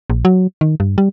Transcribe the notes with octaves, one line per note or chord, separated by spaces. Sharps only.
A#1
F#3
D#3
G2
G3